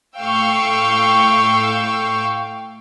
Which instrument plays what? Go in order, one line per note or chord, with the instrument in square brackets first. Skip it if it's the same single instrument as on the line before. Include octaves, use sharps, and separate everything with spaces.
[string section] A2 A3 F5 G5 C#6 E6